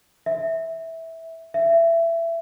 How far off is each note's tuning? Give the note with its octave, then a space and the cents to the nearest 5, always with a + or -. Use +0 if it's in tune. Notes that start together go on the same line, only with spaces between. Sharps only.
E5 -15
E5 +20